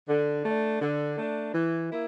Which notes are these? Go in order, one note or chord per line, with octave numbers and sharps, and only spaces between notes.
D3
A3 D4
D3
A3 D4
E3
A#3 E4